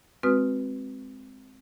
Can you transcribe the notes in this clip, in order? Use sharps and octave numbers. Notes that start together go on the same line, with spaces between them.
G#3 C4 F#4 B4 D#6 F6